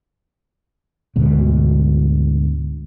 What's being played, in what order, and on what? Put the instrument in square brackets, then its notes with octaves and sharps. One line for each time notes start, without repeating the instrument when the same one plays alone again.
[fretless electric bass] D2 G#2 B2